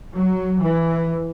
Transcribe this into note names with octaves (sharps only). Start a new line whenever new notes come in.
F#3
E3